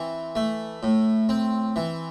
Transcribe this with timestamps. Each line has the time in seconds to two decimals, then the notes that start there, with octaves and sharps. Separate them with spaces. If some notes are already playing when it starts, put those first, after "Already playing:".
Already playing: E3 C4
0.35 A3
0.83 A2
1.29 C4
1.76 E3